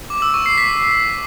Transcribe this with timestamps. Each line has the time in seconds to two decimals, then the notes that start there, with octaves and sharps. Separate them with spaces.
0.10 D6
0.22 E6
0.34 C#6
0.46 C7
0.58 B6